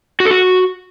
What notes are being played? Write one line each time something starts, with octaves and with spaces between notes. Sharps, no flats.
F#4
A4
F#4